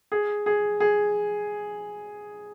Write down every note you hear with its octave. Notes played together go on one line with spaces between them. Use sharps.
G#4
G#4
G#4